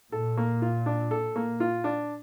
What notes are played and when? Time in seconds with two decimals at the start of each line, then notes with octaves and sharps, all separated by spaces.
0.12 A#2 A4
0.37 A#3
0.62 F4
0.86 D4
1.11 A4
1.36 A#3
1.60 F4
1.84 D4